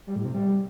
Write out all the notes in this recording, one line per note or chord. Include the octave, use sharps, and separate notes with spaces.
G3
A2
C3
G3